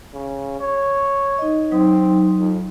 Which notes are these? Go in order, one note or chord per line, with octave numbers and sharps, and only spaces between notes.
C#3
C#5
D#4 D#5
F#3 C4 D#4
F2